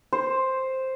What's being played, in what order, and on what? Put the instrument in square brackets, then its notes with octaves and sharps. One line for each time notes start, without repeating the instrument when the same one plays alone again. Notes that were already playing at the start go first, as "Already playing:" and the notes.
[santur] C5